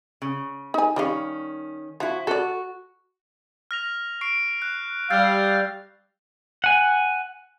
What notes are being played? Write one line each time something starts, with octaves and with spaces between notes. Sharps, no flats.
C#3
D#4 G#5
D#3 G3 C#4 D#5 F5
F3 E4 F#4
F#4 A4 D5
F6 A#6 F7
C#6 C7 D7
F#6
G3 F5 E6 G6 A6
F#5 G#5